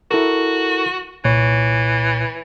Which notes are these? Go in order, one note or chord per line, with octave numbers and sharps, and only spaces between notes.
E4 F#4 A4 A#4
C2 A#2 E3 C#5